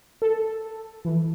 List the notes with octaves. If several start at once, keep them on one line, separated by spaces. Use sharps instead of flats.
A4
E3